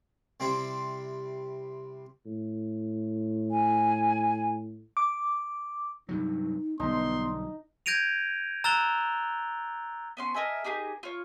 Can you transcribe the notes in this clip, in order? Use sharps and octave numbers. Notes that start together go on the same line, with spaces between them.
C3 G3 C4 E4 C5
A2
G#5
D6
G2 C3 F#3 D#4
B1 D3 G3 B3 D#4 C6
G6 G#6 A#6 D7 D#7 F7
A#5 E6 F#6 A6 F7 G7
B3 C#4 C6
A#4 D#5 E5 G#5
D#4 G4 G#4 A#4
F4 C#5